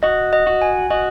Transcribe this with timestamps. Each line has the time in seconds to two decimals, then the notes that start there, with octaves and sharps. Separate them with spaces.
0.03 F#4 D#5
0.33 D#5
0.47 F#4
0.62 G#5
0.90 F#4 D#5